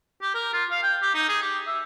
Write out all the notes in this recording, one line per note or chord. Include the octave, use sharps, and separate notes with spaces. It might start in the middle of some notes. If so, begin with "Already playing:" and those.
G4
A#4
F4
F5
G5
G4
D#4
G#4
G4
E5